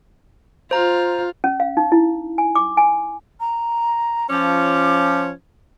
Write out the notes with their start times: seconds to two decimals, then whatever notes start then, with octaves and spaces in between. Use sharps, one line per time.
0.71 F4 C5 A#5
1.44 C#4
1.60 F5
1.77 D#4
1.92 E4
2.38 G#5
2.55 D6
2.77 G#5
3.40 A#5
4.29 F3 C#4 D6